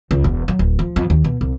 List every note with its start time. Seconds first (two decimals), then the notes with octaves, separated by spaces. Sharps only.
0.11 C#2
0.24 E1
0.48 F#3
0.59 D1
0.79 F3
0.96 F2
1.10 D#2
1.24 B2
1.41 C2